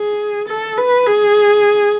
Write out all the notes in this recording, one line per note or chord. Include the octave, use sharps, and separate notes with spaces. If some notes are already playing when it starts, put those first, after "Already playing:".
Already playing: G#4
A4
B4
G#4